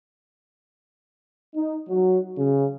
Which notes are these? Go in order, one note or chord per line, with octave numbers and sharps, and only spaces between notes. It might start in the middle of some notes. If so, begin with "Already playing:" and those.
D#4
F#3
C#3